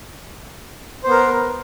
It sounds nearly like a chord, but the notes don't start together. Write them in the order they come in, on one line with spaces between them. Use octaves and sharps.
C5 B3 A#4